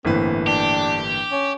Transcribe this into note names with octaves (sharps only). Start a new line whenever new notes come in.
G1 A2 E3 A#3 C4 B4
D4 G4
C#4